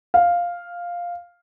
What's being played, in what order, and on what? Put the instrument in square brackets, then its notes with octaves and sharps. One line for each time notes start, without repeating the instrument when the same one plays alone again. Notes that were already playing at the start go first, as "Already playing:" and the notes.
[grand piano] F5